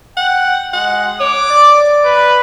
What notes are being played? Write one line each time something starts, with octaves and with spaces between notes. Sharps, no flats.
F#5 G5
G#3 F#5
C#5 D6
D5
B4